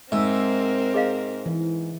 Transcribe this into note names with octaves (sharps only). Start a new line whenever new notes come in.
G#2 C4 A#4 E5
G#4 D#5 F5
E3